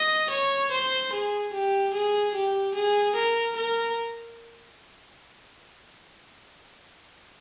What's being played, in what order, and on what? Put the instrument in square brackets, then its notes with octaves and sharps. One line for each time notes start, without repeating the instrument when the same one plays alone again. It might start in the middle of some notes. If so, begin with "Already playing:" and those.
Already playing: [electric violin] D#5
C#5
C5
G#4
G4
G#4
G4
G#4
A#4
A#4